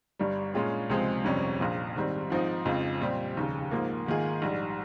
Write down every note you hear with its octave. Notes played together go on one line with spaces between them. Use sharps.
G1 G2 G3
A#2 G#3 C#4 F4 G#4
C#2 C3 F3 G#3 C4
G1 F2 C3 G3 C#4
A#1 A#2 F3
G#2 D#3 G3 C4
G#2 F3 C4 D#4
F2 C#3 F3 G#3 C4
A#2 G3 C4 G4
F1 D#2 C#3
G#2 F3 A#3
G#2 D#3 A#3 F4 G#4
A#1 G#2 G3